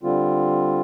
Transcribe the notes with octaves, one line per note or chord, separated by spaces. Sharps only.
D3 G3 C4 F4